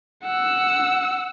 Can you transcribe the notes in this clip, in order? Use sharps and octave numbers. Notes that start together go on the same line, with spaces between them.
F#5 E6